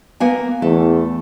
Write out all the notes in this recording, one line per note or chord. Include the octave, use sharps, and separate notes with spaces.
A#3 B3 G#5
E2 A3